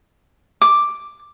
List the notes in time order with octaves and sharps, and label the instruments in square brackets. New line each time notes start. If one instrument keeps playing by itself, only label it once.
[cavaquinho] D6